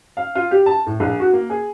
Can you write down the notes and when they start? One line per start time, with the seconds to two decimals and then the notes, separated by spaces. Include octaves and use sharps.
0.17 F5
0.35 F4
0.51 G4
0.66 A5
0.86 A2
1.00 A#1
1.20 F#4
1.33 A#3
1.50 G#4